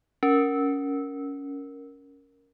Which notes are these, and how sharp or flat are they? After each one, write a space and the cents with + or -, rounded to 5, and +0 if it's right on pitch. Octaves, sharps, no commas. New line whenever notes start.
C#4 +15 A#4 +0